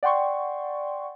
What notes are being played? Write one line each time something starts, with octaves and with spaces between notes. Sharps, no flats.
D5 F#5 G5 C6 C#6